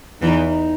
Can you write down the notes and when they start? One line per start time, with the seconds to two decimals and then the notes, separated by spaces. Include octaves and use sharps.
0.22 E2 E3 D#4
0.46 D#4